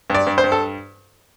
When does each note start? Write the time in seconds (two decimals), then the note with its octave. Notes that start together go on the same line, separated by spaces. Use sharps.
0.10 G2 D5
0.27 G2
0.38 C5
0.44 G2
0.52 A4